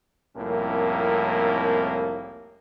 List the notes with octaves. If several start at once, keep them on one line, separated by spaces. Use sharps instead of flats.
C2 F2 A2 A#3 C#4 A#4